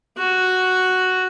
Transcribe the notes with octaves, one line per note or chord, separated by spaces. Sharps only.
F#4